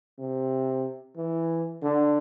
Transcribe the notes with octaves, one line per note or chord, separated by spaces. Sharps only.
C3
E3
D3